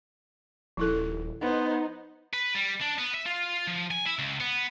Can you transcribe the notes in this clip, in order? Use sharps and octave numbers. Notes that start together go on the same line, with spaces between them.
D#1 F3 E4 A4
B3 D#4 C5
B4
G3
D4
B3
E5
F4
F3
G#5
E4
C#2
B3